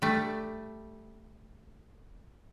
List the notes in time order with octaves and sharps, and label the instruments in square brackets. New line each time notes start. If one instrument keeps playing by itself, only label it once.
[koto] G3 A3